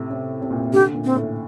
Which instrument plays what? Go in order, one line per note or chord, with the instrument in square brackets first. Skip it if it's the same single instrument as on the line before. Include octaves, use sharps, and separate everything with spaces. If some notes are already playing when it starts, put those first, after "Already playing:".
Already playing: [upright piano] A2 C3
C3
C3
A#2
C3
[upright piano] D3 [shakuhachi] G4
[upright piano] A#2
[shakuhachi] C4
[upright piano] A2